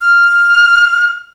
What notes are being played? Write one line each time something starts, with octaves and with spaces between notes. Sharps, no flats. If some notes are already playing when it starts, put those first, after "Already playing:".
F6